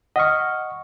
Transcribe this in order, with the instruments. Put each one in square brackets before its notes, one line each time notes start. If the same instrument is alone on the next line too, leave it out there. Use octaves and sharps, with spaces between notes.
[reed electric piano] D#5 C#6 [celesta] F#5 F6